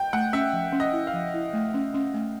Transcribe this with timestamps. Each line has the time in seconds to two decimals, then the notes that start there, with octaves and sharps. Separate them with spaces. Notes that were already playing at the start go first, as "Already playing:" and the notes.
Already playing: G5
0.13 A3 F#5
0.33 C#4 E5
0.53 F3
0.73 C#4
0.80 D#5
0.93 E4
1.07 F5
1.13 F3
1.34 E4
1.53 A3
1.74 C#4
1.94 C#4
2.14 A3